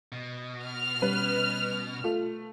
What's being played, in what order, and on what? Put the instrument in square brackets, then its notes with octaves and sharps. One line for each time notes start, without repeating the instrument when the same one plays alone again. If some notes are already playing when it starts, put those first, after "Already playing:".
[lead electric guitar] B2
[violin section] F6
[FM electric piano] G3 C#4 [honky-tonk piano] B4
[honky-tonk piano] A3 [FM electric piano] F4